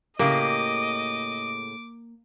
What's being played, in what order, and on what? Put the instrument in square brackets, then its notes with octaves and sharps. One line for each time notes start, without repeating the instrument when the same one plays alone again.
[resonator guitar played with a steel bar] A2 C#3 G4 [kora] A#3 [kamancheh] D#5 [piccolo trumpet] D6